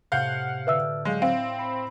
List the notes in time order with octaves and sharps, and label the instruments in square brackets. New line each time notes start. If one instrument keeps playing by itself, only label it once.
[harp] A2 C3 [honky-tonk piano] F5 F#5 G6
[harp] D3 D5 F6 [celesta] B4 E5 E6
[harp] F#3 F5 G6 [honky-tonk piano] G#3
[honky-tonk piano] C4 [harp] E4 [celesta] F5
[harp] B5 C7 C#7